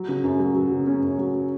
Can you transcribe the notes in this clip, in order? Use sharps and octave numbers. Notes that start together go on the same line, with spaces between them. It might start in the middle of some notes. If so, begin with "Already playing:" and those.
Already playing: F#3
C#3
F#2
F#3
F#3
C#3
C#4
F#2
F#3